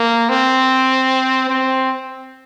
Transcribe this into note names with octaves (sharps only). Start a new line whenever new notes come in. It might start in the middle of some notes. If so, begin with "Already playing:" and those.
Already playing: A#3
C4
C4